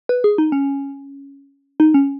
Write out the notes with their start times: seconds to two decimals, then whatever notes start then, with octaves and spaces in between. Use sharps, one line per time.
0.09 B4
0.24 G#4
0.38 D#4
0.52 C#4
1.80 D#4
1.94 C#4